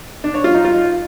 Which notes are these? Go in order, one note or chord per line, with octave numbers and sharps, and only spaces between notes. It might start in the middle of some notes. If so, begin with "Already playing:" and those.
D4
C#5
F4
D#4
F4